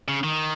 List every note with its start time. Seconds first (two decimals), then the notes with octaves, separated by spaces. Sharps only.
0.08 C#3
0.24 D#3